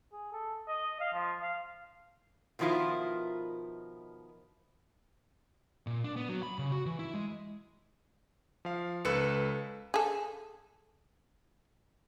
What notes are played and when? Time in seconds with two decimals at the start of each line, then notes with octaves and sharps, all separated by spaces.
0.12 G#4
0.32 A4
0.68 D#5
1.00 F5
1.13 F3
1.42 F5
2.59 B2 D#3 F3 E4 F4 A#4
5.87 A#2
6.04 D4
6.16 B3
6.29 F#3
6.43 B5
6.59 C#3
6.72 F#4
6.86 E3
6.99 E4
7.14 G#3
8.65 F3 F5
9.05 C#2 A4 B4 C#7
9.94 G#4 A4